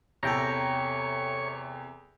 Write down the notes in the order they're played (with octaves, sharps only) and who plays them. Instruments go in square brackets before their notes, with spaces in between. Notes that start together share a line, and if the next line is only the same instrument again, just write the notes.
[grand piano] E2 C3 [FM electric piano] A4 G5 A#5 [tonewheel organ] C#5